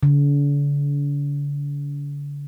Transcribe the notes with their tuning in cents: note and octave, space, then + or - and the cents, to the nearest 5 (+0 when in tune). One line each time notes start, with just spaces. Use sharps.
D3 -40